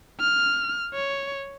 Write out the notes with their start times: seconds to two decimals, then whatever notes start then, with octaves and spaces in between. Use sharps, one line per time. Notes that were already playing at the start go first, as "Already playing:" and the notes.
0.20 F6
0.94 C#5